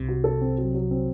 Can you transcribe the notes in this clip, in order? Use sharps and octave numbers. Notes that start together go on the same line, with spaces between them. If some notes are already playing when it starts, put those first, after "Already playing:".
Already playing: C2 C3
F#4
A4
C4
F#3
F#3
C4